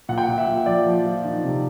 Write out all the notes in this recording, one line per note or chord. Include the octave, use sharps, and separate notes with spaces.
A#2 F#5
G5
F#5
A#2
E5
A#2
F3 D5
F3
F3
D#3
C3